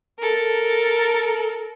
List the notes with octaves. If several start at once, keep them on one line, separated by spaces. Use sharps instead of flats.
A4 A#4